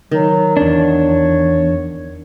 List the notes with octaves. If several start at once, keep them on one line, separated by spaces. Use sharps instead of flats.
D#3 F#3
E2 D4 C#5